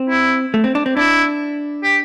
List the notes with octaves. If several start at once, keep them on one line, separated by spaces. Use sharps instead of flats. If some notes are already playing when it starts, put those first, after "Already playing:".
Already playing: C4
E4
A3
C4
D4
C4
D4 E4
G4